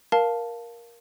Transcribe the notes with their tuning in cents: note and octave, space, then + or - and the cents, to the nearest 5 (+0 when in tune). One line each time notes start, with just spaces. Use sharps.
A#4 +10 F5 +0 A5 +0